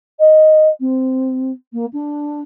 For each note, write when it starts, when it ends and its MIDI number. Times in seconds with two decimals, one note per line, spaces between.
0.19 0.68 75
0.80 1.51 60
1.72 1.85 58
1.92 2.40 62